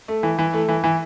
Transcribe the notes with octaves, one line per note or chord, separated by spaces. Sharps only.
A3
E3
E3
A3
E3
E3